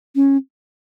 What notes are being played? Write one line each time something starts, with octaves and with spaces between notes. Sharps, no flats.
C#4